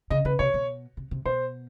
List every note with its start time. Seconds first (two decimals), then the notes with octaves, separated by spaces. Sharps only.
0.10 C#3 D#5
0.25 C#3 B4
0.39 C3 C#5
0.54 B2
0.97 C3
1.11 C3
1.25 B2 C5